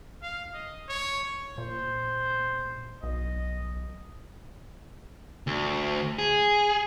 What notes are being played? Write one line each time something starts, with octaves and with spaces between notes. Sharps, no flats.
F5
D#5
C#5
A#2 C5
B1 D#5
D2
G#4